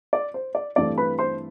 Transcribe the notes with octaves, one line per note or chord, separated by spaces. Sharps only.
D5
C5
D5
G2 E3 A3 C4 D5
B4 B5
C5 C6